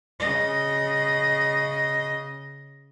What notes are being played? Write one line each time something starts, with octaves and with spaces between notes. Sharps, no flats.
C#3 D#5